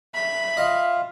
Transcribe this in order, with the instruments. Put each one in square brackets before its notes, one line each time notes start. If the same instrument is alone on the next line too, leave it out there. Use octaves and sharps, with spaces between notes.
[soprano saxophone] E5 [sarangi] B5
[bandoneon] F4 F5 [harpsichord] D#5